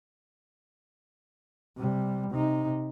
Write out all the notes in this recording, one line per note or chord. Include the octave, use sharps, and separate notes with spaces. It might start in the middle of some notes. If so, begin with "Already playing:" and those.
C3 G3
C3 D#4